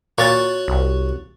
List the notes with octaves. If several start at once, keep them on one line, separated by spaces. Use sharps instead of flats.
A#2 F#4 C#5 F#5 A6
C2